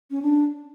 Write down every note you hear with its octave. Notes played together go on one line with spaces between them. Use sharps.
C#4
D4